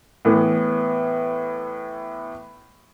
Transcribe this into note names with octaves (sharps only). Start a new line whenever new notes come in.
A2 E3 B3